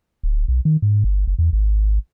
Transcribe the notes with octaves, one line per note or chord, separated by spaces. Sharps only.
D1
B1
D#3
G#2
G1
F#1
E2
G#1